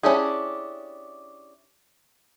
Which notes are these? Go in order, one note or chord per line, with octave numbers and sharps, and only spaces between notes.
C#4 D4 E4 G4 G#4